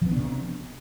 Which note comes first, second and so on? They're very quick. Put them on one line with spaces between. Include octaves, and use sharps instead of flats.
F3 B3 D4 C3